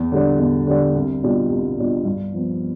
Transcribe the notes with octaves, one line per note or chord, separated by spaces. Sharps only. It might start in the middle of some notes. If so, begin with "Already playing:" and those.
Already playing: E2
D3 G3 D4
E2
D3 G3 D4
C2
B2 G3 D4 F4
C2
B2 G3 D4 F4
G2
F3 B3